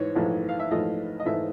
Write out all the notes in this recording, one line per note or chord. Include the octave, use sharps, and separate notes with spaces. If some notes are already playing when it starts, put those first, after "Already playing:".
Already playing: G#2 E3 C#5
A#1 G#2 E3 A3
F5
E5
A#1 G#2 E3 A3 D#5
D#5
G#2 E3 A3 E5